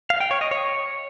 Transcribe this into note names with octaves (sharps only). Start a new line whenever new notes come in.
F5
G5
C#5
D#5
C#5